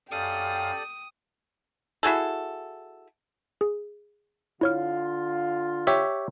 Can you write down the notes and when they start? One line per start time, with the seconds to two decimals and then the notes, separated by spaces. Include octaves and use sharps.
0.11 F#2 G4 A4 D5 F5 G5 D#6
2.03 E4 F#4 G#4 A4
3.61 G#4
4.61 D3 E4 F4 C#5 F6
5.87 G4 C#5 E5